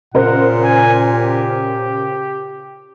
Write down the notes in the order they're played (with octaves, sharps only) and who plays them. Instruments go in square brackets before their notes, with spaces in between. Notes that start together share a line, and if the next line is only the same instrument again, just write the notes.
[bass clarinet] A#2 [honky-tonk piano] C#3 A#4 C5 [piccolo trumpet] F#5
[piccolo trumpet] G#5
G4